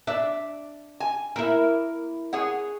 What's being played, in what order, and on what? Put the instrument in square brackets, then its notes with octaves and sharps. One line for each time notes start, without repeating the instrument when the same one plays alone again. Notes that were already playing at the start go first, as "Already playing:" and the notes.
[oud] D4 [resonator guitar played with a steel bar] D5 E5
[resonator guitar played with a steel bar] G#5
[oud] A#3 E4 [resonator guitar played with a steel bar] A#4
[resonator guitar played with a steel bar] G#4 C#5 F#5